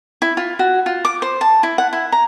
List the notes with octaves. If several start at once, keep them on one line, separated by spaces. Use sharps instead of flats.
E4
F4
F#4
F4
D6
C5
A5
E4
F#5
E4
A#5